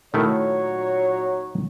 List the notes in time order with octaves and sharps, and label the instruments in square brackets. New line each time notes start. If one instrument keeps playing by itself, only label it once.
[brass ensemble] A#2 D#4 C#5 [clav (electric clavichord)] D#3 A3 E4 [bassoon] F#3